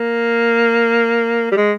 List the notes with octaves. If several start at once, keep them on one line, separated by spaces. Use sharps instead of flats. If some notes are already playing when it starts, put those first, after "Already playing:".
Already playing: A#3
G3
G#3